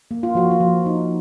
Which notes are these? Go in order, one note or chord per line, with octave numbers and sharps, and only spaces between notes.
A#3
F4
F3 F#4
F4
F3
D#4